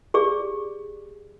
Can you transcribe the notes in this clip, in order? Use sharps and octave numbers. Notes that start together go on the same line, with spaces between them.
G4 G#4 D5